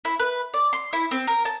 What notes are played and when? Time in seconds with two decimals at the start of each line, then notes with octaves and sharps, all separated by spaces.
0.05 E4
0.19 B4
0.54 D5
0.73 C6
0.93 E4
1.11 C4
1.27 A#4
1.45 A5